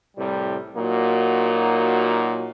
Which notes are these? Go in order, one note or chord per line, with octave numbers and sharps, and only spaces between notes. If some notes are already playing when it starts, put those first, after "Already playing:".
C2 A2 C3 G3
A#2 F#3 A#3 D#4 F#4